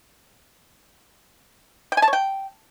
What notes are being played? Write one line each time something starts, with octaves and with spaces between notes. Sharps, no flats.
G5
G#5
A5
C#5
G5